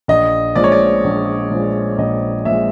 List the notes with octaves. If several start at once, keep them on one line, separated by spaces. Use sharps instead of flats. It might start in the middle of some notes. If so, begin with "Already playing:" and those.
A#1 D#5
A#2 F3 G#3 D5
C#5
D5
A#1
A#2 F3 G#3
A#1 D#5
A#2 F3 G#3 E5